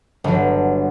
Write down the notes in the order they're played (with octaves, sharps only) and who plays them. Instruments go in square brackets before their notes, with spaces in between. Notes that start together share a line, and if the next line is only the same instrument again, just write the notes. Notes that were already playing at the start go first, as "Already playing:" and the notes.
[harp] G1 F#3